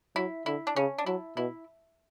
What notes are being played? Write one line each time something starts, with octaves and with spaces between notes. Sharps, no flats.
F#3 E4
D3 E4
D4
C#3 C#4
D4
F#3 E4
B2 E4